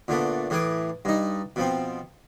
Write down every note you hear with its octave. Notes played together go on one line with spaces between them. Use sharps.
A#2 D3 A3 B3
A2 E3 G#4 D6
G2 D#4
B2 F3 C4